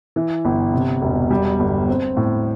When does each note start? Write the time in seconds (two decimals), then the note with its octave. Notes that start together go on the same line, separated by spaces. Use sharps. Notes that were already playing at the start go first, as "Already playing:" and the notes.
0.16 E3
0.45 G1
0.74 C3
1.02 E1
1.31 G3
1.59 G1
1.89 C4
2.17 A2